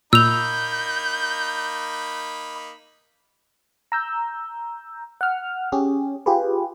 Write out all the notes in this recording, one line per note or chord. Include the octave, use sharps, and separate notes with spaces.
A#2 A#3 D#4 B5 E6 G6 F7
A#5 E6 G6
F#5 F6
C#4 G4 G#4
F4 G4 G#4 B4